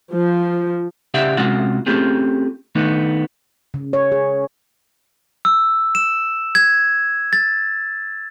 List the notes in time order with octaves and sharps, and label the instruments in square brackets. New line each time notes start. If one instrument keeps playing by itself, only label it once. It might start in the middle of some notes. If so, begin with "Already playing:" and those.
[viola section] F3
[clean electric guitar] C#3 G4 D5 E5 F#5
C3 G#3 C#4 F4 F#4 F#5
A3 C4 C#4 F4 G4 G#4
D#3 A3 B3 D4 D#4
[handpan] C#3
C#5
G#4
[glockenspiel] E6
E7
G#6
A6